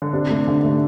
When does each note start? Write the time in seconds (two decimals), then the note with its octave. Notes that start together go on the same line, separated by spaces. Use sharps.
0.02 D3
0.13 C3 D4
0.30 A3
0.47 D3 D4
0.64 A3